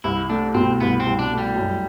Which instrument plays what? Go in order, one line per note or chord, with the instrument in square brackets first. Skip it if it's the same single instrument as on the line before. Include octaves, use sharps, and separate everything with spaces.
[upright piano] C2 [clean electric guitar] E4
[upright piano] A3 [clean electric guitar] D4
[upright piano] B2 [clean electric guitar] C4
[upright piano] C2 [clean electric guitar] B3
[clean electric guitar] C4
[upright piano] C2
[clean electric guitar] D4
[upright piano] A3
[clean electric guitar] G3
[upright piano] F#2